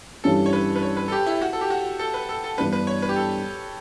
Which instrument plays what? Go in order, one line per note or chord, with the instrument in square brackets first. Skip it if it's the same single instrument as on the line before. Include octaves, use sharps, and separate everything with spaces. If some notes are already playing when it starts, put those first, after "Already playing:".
[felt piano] G2 E3 G3 C#4 E4 [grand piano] A4
[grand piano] C#5
B4
B4
C#5
B4
A4
G4
E4
F#4
A4
G4
F#4
A4
B4
A4
A4
[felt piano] G2 E3 B3 D4 [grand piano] B4
[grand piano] B4
C#5
B4
G4
A4